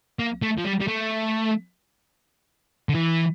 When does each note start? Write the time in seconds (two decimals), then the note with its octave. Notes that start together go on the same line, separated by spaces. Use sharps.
0.19 A#3
0.42 A3
0.58 F3
0.65 G3
0.81 G3
0.88 A3
2.89 D3
2.95 E3